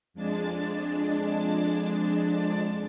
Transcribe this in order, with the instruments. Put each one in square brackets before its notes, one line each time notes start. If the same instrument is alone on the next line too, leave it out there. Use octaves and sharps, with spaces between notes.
[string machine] F2 G#3 D4 A5 A6